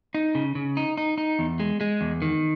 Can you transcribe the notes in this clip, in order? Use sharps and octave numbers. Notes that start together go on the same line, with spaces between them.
D#4
C#3
C#3
D#4
D#4
D#4
E2
G#3
G#3
E2
D#3